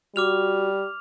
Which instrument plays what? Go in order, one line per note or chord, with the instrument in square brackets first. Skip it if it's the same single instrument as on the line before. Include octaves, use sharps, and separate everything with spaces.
[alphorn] G3 [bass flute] F#4 [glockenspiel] D6 F6 F7